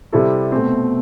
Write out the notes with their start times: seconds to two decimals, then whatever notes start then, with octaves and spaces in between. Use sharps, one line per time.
0.12 C3 G3 C4 E4 A4
0.52 B2 A3 C4